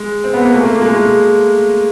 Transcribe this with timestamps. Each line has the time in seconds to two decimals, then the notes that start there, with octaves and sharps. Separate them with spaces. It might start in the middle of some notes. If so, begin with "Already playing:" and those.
Already playing: G#3
0.24 C4
0.34 B3
0.45 A#3
0.54 A3
0.65 A#3
0.75 A#3
0.81 G#3
0.85 A3
0.96 G#3